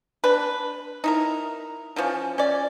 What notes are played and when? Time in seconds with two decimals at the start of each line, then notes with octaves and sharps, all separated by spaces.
0.24 D4 B4
1.04 D#4 E4 A#4
1.96 D3 E3 F3 C#4
2.38 C#4 D5